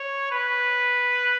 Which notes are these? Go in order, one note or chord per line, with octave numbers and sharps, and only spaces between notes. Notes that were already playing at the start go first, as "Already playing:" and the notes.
Already playing: C#5
B4